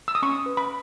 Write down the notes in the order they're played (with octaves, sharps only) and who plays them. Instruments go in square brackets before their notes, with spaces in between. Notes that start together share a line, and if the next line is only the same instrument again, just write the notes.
[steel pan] E6
D#6
C#4 C#6
B4
B5